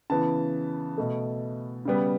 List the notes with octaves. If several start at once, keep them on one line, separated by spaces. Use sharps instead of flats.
C#3 E3 B3 A5
B2 A3
C#3 G3 B3